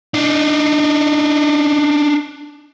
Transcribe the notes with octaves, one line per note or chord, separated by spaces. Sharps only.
D4 D#4